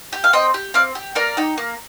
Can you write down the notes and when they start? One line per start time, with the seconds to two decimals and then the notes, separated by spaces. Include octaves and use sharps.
0.12 G4
0.24 F5
0.33 C4 D#5 G5
0.54 G4
0.74 C4 D5 F5
0.95 G4
1.15 A#3 A#4 D5
1.37 D#4 G4
1.58 A#3